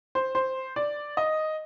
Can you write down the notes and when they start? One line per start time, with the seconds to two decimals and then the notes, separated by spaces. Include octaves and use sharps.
0.15 C5
0.35 C5
0.76 D5
1.17 D#5